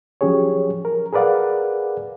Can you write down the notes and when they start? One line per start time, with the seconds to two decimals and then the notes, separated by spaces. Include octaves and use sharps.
0.21 F3 F#3 C#4 G4 G#4 C#5
0.85 A#4
1.13 G#4 A#4 B4 D5 F5 F#5